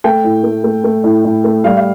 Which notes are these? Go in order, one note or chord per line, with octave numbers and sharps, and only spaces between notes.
A3 G5
A2
A3
A3
A3
A2
A2
A3
G3 F5
F5